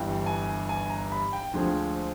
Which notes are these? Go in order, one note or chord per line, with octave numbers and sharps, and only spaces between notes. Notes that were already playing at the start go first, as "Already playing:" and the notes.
Already playing: G1 G2 E3 G5
G#5
G#5
A#5
B5
G5
D2 D3 F3 G#3 C4